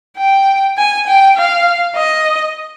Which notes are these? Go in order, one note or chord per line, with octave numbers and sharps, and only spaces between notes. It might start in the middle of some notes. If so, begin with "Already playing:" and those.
G5
G#5
G5
F5
D#5